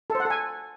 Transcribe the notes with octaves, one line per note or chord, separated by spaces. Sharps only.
A4
C5
F#5
A4
G#5